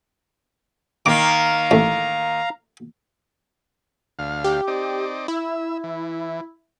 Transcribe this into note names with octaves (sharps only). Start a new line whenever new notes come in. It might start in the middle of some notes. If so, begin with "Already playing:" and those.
D#3 A#3 F5 A#5 D6
A1 A3
D2 F5
G4
C4 D#4 D5
E4 E5
E3